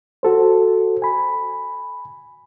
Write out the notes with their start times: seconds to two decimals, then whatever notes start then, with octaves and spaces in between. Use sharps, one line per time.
0.23 F#4 A4 C5
1.02 G#5 B5